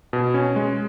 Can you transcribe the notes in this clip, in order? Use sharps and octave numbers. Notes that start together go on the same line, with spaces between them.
B2
C#4
G#3